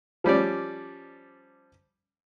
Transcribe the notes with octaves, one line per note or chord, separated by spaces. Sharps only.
F3 G3 C#4 D5